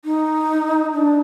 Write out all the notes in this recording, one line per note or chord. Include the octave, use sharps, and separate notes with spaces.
D#4
D4